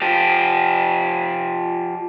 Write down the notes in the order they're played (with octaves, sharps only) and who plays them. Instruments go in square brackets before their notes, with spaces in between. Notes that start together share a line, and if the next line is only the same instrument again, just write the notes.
[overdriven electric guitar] F3 G4